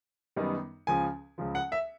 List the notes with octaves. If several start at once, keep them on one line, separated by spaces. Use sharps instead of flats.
F#2 D#3 G3 B3 D#4
C#2 C#3 F3 G#5
C#2 C#3 F3
F#5
E5